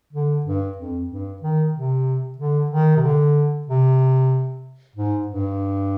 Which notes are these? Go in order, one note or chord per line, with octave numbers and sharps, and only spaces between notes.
D3
G2
F2
G2
D#3
C3
D3
D#3
C3
D3
C3
G#2
G2